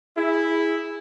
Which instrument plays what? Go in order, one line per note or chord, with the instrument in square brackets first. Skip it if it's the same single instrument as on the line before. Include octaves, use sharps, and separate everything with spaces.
[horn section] E4 [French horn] G#4